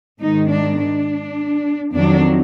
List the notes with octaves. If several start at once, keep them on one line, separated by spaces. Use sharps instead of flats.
G#2 D#3 G#3 D#4
D4
D4
F2 D#3 F#3 D4